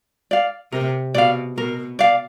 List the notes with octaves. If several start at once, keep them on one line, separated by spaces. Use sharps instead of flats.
D5 F5
C3 A#4
B2 D5 F5
B2 A#4
D5 F5